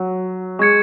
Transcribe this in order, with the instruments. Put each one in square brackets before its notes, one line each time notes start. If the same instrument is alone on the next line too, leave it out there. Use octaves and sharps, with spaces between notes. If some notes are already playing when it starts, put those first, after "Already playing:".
Already playing: [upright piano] F#3
[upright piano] G#3 [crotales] C#6 G#6 C#7